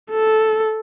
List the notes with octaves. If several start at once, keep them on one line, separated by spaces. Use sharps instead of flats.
A4